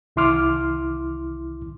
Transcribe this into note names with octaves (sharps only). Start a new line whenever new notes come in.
C2 D#3 E4 C6 D6 F6